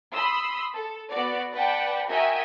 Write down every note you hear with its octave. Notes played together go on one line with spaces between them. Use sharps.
B5 C6 D#6 E6
A4
B3 F#4 D5
B4 D5 F#5 G5 A5
F#4 A#4 D#5 E5 G5 G#5